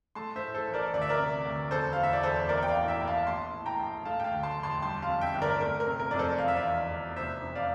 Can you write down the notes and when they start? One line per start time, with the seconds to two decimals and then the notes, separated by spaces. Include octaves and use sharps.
0.15 A3 A5 C6
0.36 C5 E5
0.41 A2
0.54 A4 C5
0.67 A1
0.73 A#4 D5
0.93 D2 D5
1.01 E5
1.09 A#4 D5
1.19 C3
1.45 D2
1.71 E1 A4 C5
1.93 E2 F5
2.03 E5
2.13 D5
2.23 E1 A4 C5
2.49 A#1 A#4 D5
2.63 G5
2.68 D5 F5
2.76 A2
2.88 E5 G5
3.02 A#1
3.08 F5 A5
3.26 A#1 A5 C6
3.53 A2
3.66 G5 A#5
3.79 A#1
4.05 A3 F5 A5
4.20 G5
4.24 F5 A5
4.31 D2
4.43 A5 C6
4.57 E1
4.63 A5 C6
4.82 G3 A5 C6
5.02 F5 A5
5.08 F2
5.21 E5 G5
5.35 G1
5.42 A#4 D5
5.61 A3 A#4
5.80 A#4
5.87 C3
6.00 A#4
6.11 F2 D5
6.19 A4 C5
6.38 E1 F5
6.48 E5
6.56 D5 F5
6.64 E2
6.91 E1
7.16 F1 C5 E5
7.43 F2
7.55 D5 F5